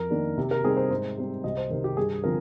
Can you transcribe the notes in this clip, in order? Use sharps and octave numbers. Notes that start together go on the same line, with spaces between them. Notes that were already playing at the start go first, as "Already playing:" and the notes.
Already playing: F2 A#4
D#3 A#3 D4
C3
A#4
G3 C4 D#4 G#4
C5
G#2 C5
G3 C4
C2 D#5
C5
C3 D#3 A#4
G4
G2 G#4
D3 F3 C4 A#4